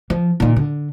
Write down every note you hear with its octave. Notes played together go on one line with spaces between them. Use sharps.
F3
A#2 D#3
D3